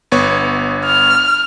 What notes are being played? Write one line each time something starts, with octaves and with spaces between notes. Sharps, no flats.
G1 B3 C#5
F6